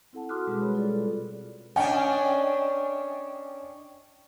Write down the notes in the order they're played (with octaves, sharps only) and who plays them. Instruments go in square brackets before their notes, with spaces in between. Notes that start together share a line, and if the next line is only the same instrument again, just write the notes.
[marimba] C4 E4 A4 F#5 A5
F#4 C6 D6 D#6 F6 F#6
B2 G3 G#3 C#4 F#4 G#4
G#4 A#4 B4 C#5 B5
F4 A4 D5
[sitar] C#4 D4 [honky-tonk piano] D#5 G5 G#5